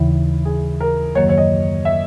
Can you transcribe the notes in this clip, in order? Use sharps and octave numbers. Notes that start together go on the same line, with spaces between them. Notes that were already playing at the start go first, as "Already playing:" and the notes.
Already playing: D#2 C#3 E3 E4
G#4
A#4
F#2 D#3 F#3 A#3 C#5
C#5
D#5
E5